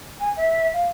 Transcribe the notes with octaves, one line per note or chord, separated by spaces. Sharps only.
G#5
E5
F5